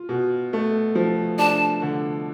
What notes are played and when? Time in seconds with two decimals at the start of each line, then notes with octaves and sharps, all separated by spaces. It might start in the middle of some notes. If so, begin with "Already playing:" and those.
Already playing: F4
0.09 B2
0.53 A3
0.95 F3
1.38 D4 A5
1.82 D3